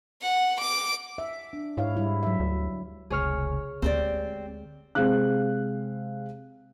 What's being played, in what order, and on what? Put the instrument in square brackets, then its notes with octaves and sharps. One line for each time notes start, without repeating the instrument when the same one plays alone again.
[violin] F#5
D6
[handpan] E5
D4
[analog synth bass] G#2 [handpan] E4 C#5 F5
[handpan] G3 E4
F#3 E5
[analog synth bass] D2
[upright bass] F1 C#2 [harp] G#4 C#5 F6
[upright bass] D2 G#3 [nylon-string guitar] C4 G4 D5
[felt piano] C3 G#3 C4 G#4 F5 F#6